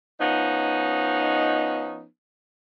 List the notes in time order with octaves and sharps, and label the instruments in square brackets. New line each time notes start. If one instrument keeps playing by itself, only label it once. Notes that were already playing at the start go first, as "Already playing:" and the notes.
[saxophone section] F3 B3 C#4 D#4